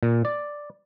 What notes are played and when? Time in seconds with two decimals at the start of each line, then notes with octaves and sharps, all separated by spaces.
0.03 A#2
0.25 D5